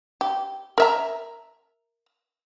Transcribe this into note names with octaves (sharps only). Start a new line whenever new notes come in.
G4
A#4 E5 A#5